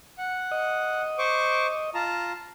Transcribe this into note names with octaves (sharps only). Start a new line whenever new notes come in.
F#5
D#5
C5 C#6 D6
F4 A5 A#5